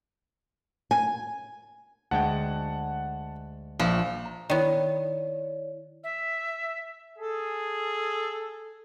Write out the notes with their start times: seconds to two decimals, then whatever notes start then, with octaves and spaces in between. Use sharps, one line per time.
0.91 G#5
2.11 D2 G#3 F#5 G5 A5
3.80 A#1 F3
4.26 A#5
4.50 D#3 B3 E4 C#5 D5
6.03 E5
7.18 G#4 A4